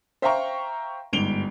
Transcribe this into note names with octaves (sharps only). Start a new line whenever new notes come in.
C5 E5 F5 G5 A#5 C#6
G1 G#2 D7 F7 G7